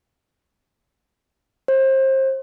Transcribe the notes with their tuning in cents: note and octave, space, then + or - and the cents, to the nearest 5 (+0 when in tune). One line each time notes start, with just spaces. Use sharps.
C5 +30